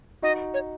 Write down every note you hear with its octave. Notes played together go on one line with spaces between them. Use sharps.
D#4 F#4 D#5
C#5